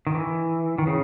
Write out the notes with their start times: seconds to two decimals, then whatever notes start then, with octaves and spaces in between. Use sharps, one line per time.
0.07 D#3
0.14 E3
0.78 D#3
0.87 C#3